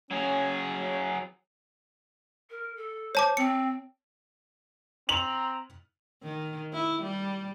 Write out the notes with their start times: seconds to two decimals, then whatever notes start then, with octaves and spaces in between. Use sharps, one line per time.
0.11 F#3 C#4 G#4
2.50 A#4
2.77 A4
3.15 C5 C#5 A5 D6
3.37 C4 C#7
5.09 C4 A#5 F7 F#7
6.23 D#3
6.73 E4
7.02 G3